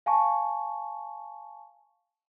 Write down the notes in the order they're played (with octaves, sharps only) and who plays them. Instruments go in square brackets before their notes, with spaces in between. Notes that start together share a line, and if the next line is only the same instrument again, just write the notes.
[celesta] F5 G#5 A5 C#6